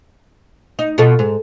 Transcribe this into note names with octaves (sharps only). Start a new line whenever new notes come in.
D#4
B2 F3 A4
G#2